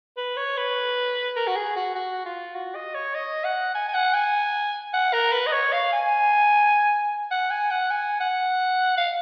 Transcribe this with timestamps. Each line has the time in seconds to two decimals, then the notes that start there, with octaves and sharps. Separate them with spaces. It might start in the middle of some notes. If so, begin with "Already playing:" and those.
0.17 B4
0.37 C#5
0.57 B4
1.36 A#4
1.47 F#4
1.56 G#4
1.76 F#4
1.95 F#4
2.26 F4
2.55 F#4
2.75 D#5
2.95 C#5
3.15 D#5
3.44 F#5
3.75 G#5
3.88 G#5
3.94 F#5
4.14 G#5
4.94 F#5
5.13 A#4
5.33 B4
5.47 D#5
5.53 C#5
5.73 F5
5.93 G#5
7.31 F#5
7.51 G#5
7.71 F#5
7.91 G#5
8.20 F#5
8.98 F5